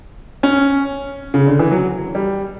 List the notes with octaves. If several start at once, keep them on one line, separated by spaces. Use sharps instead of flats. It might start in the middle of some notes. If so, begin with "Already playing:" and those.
C#4
C#3
D3
E3
F#3
G3